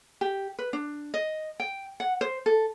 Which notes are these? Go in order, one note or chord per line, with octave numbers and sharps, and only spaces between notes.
G4
B4
D4
D#5
G5
F#5
C5
A4